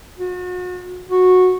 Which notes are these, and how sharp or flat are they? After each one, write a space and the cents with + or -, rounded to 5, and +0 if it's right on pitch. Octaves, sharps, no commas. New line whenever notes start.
F#4 -40
F#4 -10